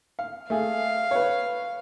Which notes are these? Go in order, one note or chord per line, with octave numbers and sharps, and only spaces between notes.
F5
A3 G#4 F5
B4 C#5